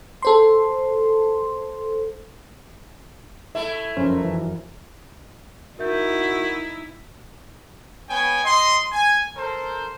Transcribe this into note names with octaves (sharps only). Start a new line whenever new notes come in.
A4 C5 C6
A3 E4 E5
F1 F#2 C#4 A#4 C5
E3
D#4 E4 F#4 A#4 E5 G6
B3 C#5 G5 G#5
D#5 C6
G#5
A4 A#4 C5